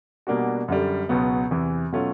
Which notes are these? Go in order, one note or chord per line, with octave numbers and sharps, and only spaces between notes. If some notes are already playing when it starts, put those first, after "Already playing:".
B2 G3 A#3 D4 F#4
F#2 D3 G3
C#2 B2 F#3 B3
E2 C3 E3
B2 F#3 A3 C#4 F4